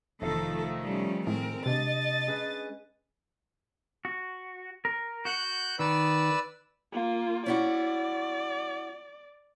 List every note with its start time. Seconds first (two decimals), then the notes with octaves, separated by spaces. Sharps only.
0.22 F1 D#3 F3 A3 D#4 A4 F5
0.83 G3 C#4
1.27 A2 G#3 C4 A#4
1.66 C3 D4 D#5 A6
2.27 C#4 G#4 B4
4.05 F#4
4.85 A#4
5.25 F#4 F#5 F#6 G6
5.79 D#3 B4 D5 E6
6.93 A#3 F4
7.46 C#4 E4 F#4 D5